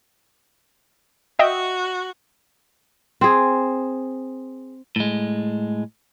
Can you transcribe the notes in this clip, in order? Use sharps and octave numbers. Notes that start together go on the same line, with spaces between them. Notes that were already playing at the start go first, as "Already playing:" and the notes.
F#4 D#5 E5 G5
C4 G#4
A2 G#3